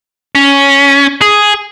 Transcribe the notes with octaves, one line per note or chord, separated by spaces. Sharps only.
C#4
G#4